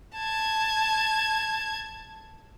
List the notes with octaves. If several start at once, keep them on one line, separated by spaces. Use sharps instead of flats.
A5 G#6